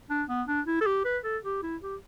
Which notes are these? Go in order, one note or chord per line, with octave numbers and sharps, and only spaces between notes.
D4
B3
D4
E4
A4
G4
B4
A4
G4
E4
G4